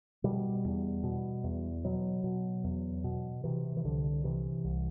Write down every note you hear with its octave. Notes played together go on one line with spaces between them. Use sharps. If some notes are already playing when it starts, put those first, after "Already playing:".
B2 G3
E2
B2
E2
B2 F#3
B2
E2
B2
C3 E3
E3
C2 D3
C3 E3
C2